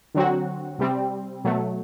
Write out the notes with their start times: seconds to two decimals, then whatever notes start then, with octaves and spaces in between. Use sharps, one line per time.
0.15 D3 F#3 C4 F#4
0.79 C3 G3 C4
1.44 B2 F#3 A3